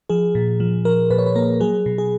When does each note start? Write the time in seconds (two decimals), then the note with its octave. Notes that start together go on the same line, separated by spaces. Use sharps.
0.10 F3 G#4
0.35 A#2
0.60 F3
0.85 F3 A#4
1.10 A#2 B4
1.18 C#5
1.26 B4
1.35 A#3 A#4
1.60 F#3 G#4
1.86 B2
1.98 G#4